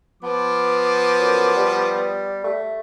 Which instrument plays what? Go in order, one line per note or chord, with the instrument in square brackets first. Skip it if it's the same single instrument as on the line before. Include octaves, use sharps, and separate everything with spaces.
[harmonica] F3 D6 [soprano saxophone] B3
[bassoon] F#2
G3
A3